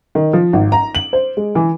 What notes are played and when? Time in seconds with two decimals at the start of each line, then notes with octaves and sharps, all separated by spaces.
0.15 D#3
0.33 F3
0.53 G#1
0.72 A#5
0.95 F#7
1.13 C5
1.37 G#3
1.55 E3